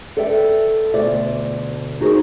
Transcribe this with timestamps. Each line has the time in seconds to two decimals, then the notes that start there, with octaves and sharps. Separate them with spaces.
0.17 A4 B4 D5 E5 G5
0.94 D2 B2 C5 D5 E5
2.00 D#4 F#4 G#4 A#4 C5